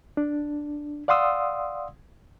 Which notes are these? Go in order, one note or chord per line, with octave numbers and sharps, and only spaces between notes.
D4
D5 F5 F#5 C6 D#6 E6